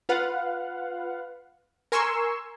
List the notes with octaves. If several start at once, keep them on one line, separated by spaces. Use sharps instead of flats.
F4 B4 F5 F#5
A#4 G#5 C6 C#6 E6